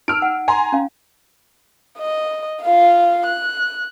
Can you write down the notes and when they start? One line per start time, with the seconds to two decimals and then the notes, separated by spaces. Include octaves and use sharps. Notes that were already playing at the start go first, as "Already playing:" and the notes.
0.08 D#4 E6 F6 D7
0.22 F#5
0.48 G#5 A#5 C6
0.72 C#4 F5
1.98 D#5
2.62 F4 F5
3.26 F#6